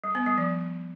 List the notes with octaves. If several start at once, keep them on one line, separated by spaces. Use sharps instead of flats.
G3
B3
G3
F3